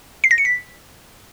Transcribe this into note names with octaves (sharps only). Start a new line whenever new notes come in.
C7
A#6
C#7
B6